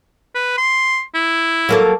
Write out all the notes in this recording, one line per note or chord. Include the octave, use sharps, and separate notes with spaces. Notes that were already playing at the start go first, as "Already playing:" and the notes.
B4
C6
E4
F#3 A#3 A4